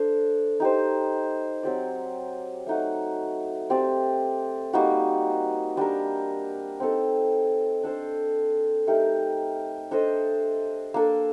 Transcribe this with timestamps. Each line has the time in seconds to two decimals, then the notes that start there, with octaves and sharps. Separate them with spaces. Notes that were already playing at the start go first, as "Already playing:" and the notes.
Already playing: D4 A4 C5
0.60 D#4 G4 C5
1.63 F#3 C4 G4 D5
2.67 A3 D#4 F#4
3.70 C4 G4 D5
4.73 G3 A#3 D#4 F#4
5.77 G3 D4 G4 A#4
6.80 C4 D#4 A4
7.83 D4 A4 C5
8.87 A3 D#4 G4 A#4
9.91 D4 A4 C5 D#5
10.94 A#3 D4 A4